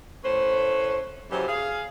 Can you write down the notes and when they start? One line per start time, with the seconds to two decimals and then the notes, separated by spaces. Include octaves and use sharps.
0.24 A2 A3 C#4 B4 C5
1.31 F#2 C#3 E3 F#3 G4 C5
1.48 G#4 F5